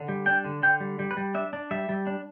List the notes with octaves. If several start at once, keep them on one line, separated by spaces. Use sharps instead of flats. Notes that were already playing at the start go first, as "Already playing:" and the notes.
Already playing: D3
G3
D4 G5
D3
D3 G5
G3
G3
B4
G3
D4 E5
D4
G3 E5
G3
D4